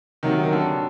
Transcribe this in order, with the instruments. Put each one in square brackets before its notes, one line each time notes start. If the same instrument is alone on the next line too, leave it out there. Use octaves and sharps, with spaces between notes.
[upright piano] C3 F#3 A#3 D#4 [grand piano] D#3
[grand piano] D#3
D3